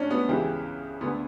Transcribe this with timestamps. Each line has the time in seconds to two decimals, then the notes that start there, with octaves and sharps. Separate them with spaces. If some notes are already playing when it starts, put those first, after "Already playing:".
Already playing: G2 C#4 D4
0.11 B3
0.29 C#2 C#3 E3 G4
1.01 D2 D3 B3